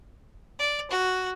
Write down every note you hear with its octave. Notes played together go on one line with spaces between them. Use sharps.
D5
F#4